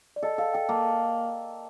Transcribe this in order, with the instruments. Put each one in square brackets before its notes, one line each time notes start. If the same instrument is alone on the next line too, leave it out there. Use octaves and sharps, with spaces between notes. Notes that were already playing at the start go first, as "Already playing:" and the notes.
[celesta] D5
[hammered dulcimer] A4 [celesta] D#5
[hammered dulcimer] A4 [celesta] F5
[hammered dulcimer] A4 [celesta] G5
[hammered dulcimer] A#3 [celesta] A5